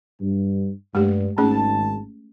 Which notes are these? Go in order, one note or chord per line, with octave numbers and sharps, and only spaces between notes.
G2
G2 G#3 A3 G4
G#1 G#2 A3 C#4 G#4 A5